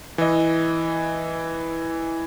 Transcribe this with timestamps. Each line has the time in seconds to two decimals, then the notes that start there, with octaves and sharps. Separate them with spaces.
0.18 E3 D#5